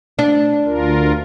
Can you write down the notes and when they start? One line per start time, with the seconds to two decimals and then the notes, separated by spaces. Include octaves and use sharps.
0.19 D4
0.66 D2 F4 A#4